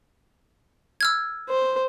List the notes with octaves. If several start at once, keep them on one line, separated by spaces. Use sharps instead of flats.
E6 F6 G#6
C5